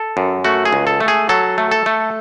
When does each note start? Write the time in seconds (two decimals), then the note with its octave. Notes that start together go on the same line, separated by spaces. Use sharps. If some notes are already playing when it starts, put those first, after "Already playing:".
Already playing: A4
0.17 F#2
0.45 A3 F#4
0.65 G#4
0.73 C#2
0.87 A4
1.00 A3
1.08 G#4
1.29 F#3 A4
1.58 A3
1.71 A4
1.86 A3